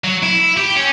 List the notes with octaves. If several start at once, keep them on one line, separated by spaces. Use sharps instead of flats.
F#3
E4
G4
C#4